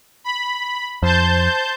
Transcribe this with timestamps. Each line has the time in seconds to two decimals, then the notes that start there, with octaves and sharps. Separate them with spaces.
0.24 B5
1.03 F2 C5 A5 G6